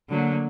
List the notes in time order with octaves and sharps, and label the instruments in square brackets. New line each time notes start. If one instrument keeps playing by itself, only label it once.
[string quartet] D3 F#3 A#3